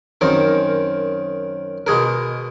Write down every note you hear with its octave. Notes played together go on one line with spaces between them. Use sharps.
F#2 D#3 C4 A#4
B2 G#3 G#4 A#4